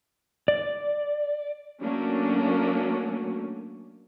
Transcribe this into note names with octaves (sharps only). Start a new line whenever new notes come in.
D5
F#3 A3 A#3 C#4 D4